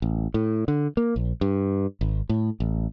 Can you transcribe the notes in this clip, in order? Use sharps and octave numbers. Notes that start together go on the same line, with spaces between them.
A1
A2
D3
A#3
A#1
G2
G#1
A2
A1